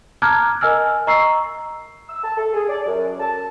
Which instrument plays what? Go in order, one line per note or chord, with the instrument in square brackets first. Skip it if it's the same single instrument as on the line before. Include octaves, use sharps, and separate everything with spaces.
[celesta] A5 A#5 D6 F6 F#6 G#6
A#4 D#5 G#5 E6 F6
D#5 A#5 C#6 E6 C7
[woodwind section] E6
A5
A4
G#4
D5
F#2
A5